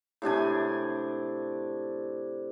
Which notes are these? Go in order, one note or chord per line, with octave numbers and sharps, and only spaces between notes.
A2 C3 D4 G#5